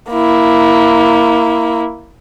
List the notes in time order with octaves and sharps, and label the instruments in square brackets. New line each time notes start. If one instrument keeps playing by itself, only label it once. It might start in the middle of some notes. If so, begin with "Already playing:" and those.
[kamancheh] A#3 E4